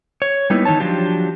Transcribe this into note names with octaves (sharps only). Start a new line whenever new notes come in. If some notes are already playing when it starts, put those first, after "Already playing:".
C#5
G3 A#3 B3 D#4 E4
D#3 E3 D#4 C#5 A5
F3 F#3 D4 F4 G4